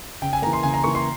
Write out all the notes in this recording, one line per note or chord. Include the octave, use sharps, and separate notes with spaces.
C#3 G5
G#5
E3 A#3 A#5
C6
C#3 G#5
A#5
E3 A#3 C#6
C6